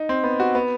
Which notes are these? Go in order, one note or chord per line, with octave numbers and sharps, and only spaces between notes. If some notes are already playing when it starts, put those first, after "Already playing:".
Already playing: D#4
C4
B3
F#4
B3